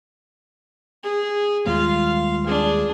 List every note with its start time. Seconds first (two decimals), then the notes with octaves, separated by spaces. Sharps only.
1.04 G#4
1.66 D#2 G3 G#3 F4 F5
2.46 D4 G#4